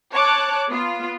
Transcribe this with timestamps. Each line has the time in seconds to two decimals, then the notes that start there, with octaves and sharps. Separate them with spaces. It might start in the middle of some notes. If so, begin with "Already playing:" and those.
0.12 C#5 A5 D6 F#6
0.69 B3 F4